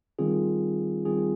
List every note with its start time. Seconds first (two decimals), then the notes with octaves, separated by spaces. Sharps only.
0.19 D#3 G3 C4 F4 G#4
1.05 D#3 G3 C4 F4 G#4